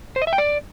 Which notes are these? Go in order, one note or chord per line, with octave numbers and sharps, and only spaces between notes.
C5
D#5
E5
G5
D5